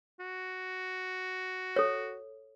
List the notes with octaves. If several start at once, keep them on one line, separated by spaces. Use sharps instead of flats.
F#4
A4 C#5